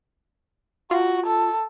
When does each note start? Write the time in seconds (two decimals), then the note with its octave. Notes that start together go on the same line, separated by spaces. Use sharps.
0.91 F4 F#4
1.26 A4